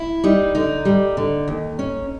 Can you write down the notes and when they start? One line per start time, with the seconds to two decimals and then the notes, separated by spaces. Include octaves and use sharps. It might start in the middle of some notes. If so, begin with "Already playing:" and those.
Already playing: E4
0.24 G3 D#4
0.55 D3 D#4
0.85 G3
1.17 D3
1.48 D#2
1.79 C#4